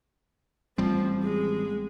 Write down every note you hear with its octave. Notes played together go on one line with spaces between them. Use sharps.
A1 F3 G3 C4
G#3